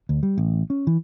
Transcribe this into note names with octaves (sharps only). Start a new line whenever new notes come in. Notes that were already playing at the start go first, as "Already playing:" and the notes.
D2
G3
A1
C#4
E3